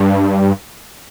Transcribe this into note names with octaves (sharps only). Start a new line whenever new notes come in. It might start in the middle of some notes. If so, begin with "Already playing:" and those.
Already playing: G2